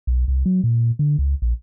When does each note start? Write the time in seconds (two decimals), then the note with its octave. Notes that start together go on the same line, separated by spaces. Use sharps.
0.07 B1
0.28 C2
0.46 F#3
0.64 A#2
0.99 D3
1.19 C#2
1.42 A#1